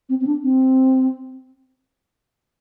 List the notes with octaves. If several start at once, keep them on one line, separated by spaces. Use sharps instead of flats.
C4
C4
D4
C4